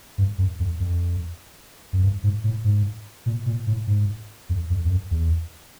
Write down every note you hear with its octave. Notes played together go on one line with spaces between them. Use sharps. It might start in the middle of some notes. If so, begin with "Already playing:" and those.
G2
F#2
F2
F2
F#2
G2
G#2
A2
G#2
A#2
A#2
A2
G#2
F2
F2
F2
F#2
E2